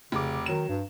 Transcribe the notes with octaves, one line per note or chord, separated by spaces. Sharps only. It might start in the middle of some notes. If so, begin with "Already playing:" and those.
F1 C#3 D6
D#3 F#3 E7
G2